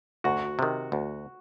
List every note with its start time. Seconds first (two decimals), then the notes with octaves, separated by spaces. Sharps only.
0.24 D2 F#4
0.59 C3 D#3
0.92 D2